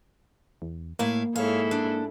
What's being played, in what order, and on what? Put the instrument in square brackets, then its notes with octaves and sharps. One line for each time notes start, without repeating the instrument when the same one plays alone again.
[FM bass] E2
[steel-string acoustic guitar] A2 E4 F5 [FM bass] A#3
[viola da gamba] G#2 E4 A4 [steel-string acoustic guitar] C#5 F5
[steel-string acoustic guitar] D4